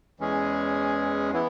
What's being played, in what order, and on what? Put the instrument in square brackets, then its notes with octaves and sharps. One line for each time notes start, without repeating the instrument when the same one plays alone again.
[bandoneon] E2 E3 G#3 C#4 G#4
E3 B3 E4